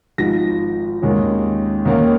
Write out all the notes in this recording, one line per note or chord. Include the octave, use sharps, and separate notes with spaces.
G#1 G#2 F3 A#6
D#2 D#3 G#3 C#4
D#2 D#3 A#3 C#4